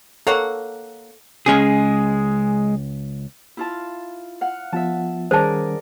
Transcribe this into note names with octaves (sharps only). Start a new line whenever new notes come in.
A#3 A4 C#5 F#5
C#2 G#3 C#4 G#4 G#5
E4 F4 A5
F5 F#5
F3 B3 F4 E5 A5
D#3 G3 C#4 G#4 A#4 C5 D5 A5